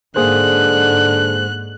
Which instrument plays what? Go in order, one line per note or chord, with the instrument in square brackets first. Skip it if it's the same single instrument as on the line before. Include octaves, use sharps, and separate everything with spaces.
[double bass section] G#2 [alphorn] D3 [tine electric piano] A#3 G#4 C5 [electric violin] F#6